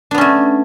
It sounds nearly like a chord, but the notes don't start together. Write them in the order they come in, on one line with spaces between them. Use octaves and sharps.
D4 B3 C#4 A3